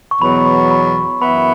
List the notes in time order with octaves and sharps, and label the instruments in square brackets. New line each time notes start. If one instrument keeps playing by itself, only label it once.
[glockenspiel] C#6
[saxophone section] E2 B2 F#3 [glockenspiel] B5
[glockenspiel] C#6
B5
[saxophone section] F#2 E3 B3 E4 [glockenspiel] B5